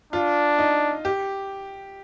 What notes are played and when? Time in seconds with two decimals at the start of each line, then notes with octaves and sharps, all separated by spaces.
0.13 D4 F4
0.59 D#4
1.05 G4